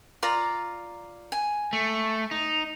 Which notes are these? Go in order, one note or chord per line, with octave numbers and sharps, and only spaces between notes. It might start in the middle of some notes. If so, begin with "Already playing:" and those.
F4 D5 A#5
G#5
A3
D#4